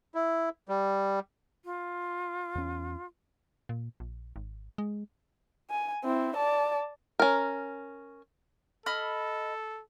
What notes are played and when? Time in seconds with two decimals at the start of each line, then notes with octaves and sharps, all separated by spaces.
0.14 E4
0.69 G3
1.65 F4
2.55 E2 C#4
3.69 A#2
4.00 A#1
4.36 G#1
4.78 G#3
5.70 G#5
6.04 C4 E4
6.36 D5 A5
7.20 C#4 A#4
8.86 A4 D#5 B5 F6